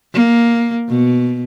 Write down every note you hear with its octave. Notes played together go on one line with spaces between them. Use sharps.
A#3
B2